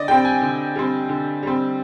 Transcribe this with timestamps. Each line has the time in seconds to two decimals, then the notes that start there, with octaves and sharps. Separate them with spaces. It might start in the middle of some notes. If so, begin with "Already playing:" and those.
Already playing: D3 D5 D#5
0.08 G3 C4 G5
0.25 G#5
0.41 D3
0.76 G3 C4
1.09 D3
1.43 G3 C4